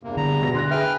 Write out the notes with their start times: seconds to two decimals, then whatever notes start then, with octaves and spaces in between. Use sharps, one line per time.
0.03 E2 G2 C3 A#3
0.17 D3 A#5
0.42 B2 A#6
0.54 D3 D4 C6 F#6 A#6
0.71 G#4 B4 E5 G5 F6